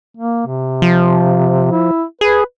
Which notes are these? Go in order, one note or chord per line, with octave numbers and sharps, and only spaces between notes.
A#3
C3
F3
E4
G#4 B4